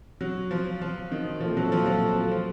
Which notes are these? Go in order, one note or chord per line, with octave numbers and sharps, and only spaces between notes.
F#3
F3
F3
D#3
A#2 F3 A3 C4 F4 A4
F#3
F3
F#3
F3